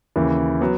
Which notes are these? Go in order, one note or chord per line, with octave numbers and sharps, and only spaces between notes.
D#2 C#3 E3
F#3 B3